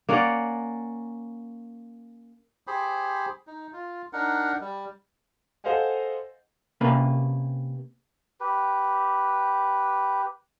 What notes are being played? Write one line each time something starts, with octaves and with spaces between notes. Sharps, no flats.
A#3 C#4 D5 F#5
G4 G#4 C5 B5
D#4
F4
D4 D#4 A#4 F#5
G3
A4 C5 D#5 F5 F#5 G#5
C3 A#3 C#4 B4
G4 B4